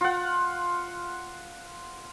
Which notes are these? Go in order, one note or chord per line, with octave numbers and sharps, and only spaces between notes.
F4 F#5